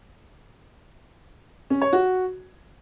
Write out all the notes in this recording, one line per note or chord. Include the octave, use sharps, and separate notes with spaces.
C#4
C#5
F#4